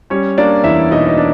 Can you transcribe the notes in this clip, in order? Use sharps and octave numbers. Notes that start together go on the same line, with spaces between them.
G3 C#4 C#5
A#3 D4 D5
E2 E4 E5
B2 D#4 D#5
D#5
D4